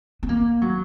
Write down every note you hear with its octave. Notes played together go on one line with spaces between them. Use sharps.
B3
A#3
F#3